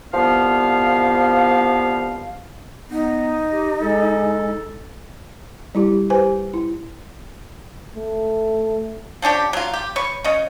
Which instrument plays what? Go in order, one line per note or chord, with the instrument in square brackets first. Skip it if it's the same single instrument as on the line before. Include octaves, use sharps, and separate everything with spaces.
[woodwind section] C2 G2 F3 B3 F5
[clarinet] B3 [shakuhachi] D#4
[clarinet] G4
[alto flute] G#3 [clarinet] A4
[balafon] G3 E4 G4
G4 B4 C5 G#5
E4
[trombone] A3
[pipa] F3 C#4 D4 G4
F#3 F4
G4
B4 C#5 C#6
C#3 C#5 D#5